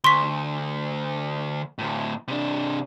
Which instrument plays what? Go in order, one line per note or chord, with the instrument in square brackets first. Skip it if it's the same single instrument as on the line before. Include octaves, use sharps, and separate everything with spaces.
[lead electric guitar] D2 [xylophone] C6 C#6 B6
[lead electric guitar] D2 A2
C3 D4